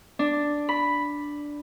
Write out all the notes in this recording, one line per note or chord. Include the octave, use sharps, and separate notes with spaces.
D4
B5